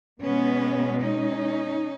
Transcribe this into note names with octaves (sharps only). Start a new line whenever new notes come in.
B2 G#3 B3 C#4
C#4 D#4